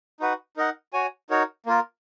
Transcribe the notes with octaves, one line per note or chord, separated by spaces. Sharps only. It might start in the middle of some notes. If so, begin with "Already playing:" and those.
D#4 F#4 B4 F#5
D#4 A#4 D#5 F#5
F#4 C#5 G#5
D#4 F#4 A#4 C#5
A#3 F4 A#4